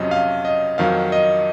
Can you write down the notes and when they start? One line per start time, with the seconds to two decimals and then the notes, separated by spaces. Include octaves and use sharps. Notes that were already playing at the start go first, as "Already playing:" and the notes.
Already playing: F2 C3 F#3 C#4 D#5
0.11 F5
0.45 D#5
0.78 F2 D#3 F#3 F5
1.12 D#5